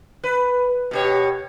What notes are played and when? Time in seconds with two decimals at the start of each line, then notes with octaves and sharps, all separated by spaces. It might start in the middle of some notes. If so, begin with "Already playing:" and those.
0.24 B4
0.91 B2 G4 C#5